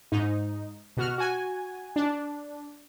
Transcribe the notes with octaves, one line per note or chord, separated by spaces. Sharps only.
G#2 D#4
B2 F#4 F6
F#4 G#5
D4